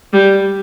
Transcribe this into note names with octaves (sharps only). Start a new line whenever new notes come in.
G3